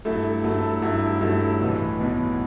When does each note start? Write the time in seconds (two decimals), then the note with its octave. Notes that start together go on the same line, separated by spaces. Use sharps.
0.05 G2 F#3 A3 E4 A4
0.44 G2 F#3 A3 E4 A4
0.82 G2 F#3 A3 E4 A4
1.21 G2 F#3 A3 E4 A4
1.61 B1 A2 E3 B3
2.00 B1 A2 E3 B3